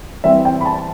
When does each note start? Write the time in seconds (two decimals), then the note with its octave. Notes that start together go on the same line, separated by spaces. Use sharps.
0.24 E3 G3 C4 E4 E5
0.45 G5
0.61 B5
0.66 A5